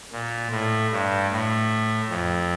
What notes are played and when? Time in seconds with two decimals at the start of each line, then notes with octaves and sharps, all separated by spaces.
0.12 A#2
0.51 A2
0.91 G2
1.30 A2
2.09 F2